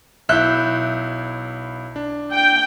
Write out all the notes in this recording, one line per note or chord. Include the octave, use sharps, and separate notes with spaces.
B1 E4 E5 F#6 G6
D4
G5